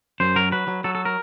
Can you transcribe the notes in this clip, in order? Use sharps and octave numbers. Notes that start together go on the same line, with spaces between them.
F#2 C5
F#3 A#4
F#3 B4
F#3
F#3 A4
A4
A#4